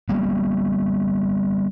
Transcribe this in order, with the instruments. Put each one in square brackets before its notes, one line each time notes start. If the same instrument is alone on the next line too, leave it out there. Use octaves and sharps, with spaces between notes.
[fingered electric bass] G3 A#3 B3